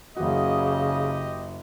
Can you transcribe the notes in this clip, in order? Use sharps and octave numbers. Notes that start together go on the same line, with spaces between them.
F#1 C#3 F#4 G4 D#5